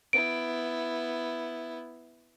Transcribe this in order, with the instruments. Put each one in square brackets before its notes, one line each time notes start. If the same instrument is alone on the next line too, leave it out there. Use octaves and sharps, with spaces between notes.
[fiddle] B3 E4 [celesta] D7